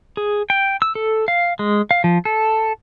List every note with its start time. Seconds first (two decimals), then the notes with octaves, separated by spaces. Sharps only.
0.17 G#4
0.50 G5
0.82 E6
0.95 A4
1.28 F5
1.59 G#3
1.91 F5
2.04 F3
2.25 A4